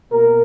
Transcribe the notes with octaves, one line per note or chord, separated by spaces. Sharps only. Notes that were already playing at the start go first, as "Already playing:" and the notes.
B2 A#3 A#4